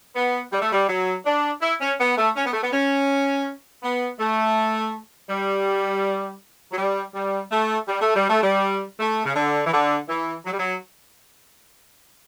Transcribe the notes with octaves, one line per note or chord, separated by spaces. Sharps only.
B3
G3
A3
G3
F#3
D4
E4
C#4
B3
A3
C#4
B3
A3
B3
C#4
B3
A3
G3
F#3
G3
G3
A3
G3
A3
G3
A3
G3
A3
C#3
D3
E3
D3
E3
F#3
G3
F#3